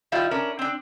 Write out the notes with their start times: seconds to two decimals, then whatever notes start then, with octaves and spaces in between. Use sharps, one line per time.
0.12 D#3 G3 E4 F4
0.31 C#4 D4 A#4
0.59 C4 D4